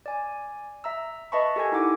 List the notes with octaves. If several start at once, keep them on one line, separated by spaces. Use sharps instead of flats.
D5 G#5
E5 A#5 E6
B4 D#5 E5 A5 B5 C#6
G4 A4 A#4 G#5 G#6
D#4 E4 F#5 D6